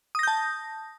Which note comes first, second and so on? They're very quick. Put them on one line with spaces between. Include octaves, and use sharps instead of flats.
D#6 A#6 G6 A5